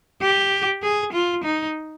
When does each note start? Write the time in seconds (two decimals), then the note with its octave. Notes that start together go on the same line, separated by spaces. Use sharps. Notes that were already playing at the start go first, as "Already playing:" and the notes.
0.22 G4
0.82 G#4
1.13 F4
1.44 D#4